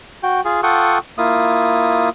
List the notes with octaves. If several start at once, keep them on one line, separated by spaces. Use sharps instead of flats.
F#4 G5
F4 G#4
F4 A4 F#5 G5 C#6 D#6
A#3 E4 F4 D#6